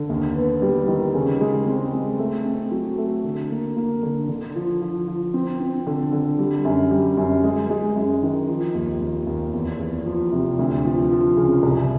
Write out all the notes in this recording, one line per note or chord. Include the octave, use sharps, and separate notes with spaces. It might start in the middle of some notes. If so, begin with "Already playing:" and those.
Already playing: D3
D#2
B3
G3
D#3
C#3
G#3
C4
G#3
A3
C4
F#3
A3
D3
A#3
A#3
D3
D3
F3
F3
F3
C4
C4
D3
D3
G3
F#2
G3
F#2
G#3
G#3
F#2
D#3
F3
D#2
D#2
D#2
E2
E2
F3
C3
D2
F3
F3
C#3
C2